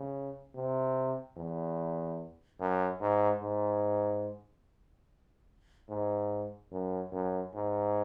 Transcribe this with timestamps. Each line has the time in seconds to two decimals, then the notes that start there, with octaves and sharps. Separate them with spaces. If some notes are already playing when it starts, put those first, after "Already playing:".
Already playing: C#3
0.55 C3
1.37 E2
2.60 F#2
3.01 G#2
3.43 G#2
5.89 G#2
6.72 F#2
7.12 F#2
7.54 G#2